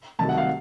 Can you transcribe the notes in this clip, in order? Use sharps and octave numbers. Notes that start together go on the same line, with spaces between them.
C2 C3 D#3 F#3 A3 A5
F#5
F5